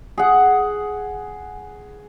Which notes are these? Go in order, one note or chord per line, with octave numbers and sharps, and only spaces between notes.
G#4 F#5